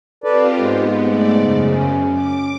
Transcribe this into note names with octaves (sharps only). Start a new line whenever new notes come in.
C4 F4 G4 A4 B4 D5
G#2 G#3 B3
A3 D5
F#2 C#3
C#4
D6